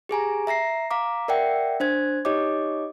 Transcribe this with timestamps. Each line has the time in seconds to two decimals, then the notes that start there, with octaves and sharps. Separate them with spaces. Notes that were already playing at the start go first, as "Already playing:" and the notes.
0.09 G4 G#4 G#5 A#5
0.47 E5 A#5 A#6 C7
0.91 F5 A#5 D6
1.28 A#4 D5 E5 F#5 G5
1.80 D4 C5 G#6
2.25 D#4 G4 C#5 D#5 D6